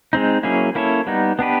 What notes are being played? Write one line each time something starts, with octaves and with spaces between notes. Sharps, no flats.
G#3 C4 D#4
F#3 A#3 C#4 E4 G#4
A#3 C#4 E4 A4 C#5
G3 B3 D#4
B3 D4 G4 B4